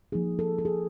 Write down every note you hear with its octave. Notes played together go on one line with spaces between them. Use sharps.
F3 A#3 D#4 G#4
A4
A4
G#4